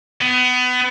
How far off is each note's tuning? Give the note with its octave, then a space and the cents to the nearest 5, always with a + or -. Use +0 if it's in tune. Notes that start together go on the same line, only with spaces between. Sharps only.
B3 +25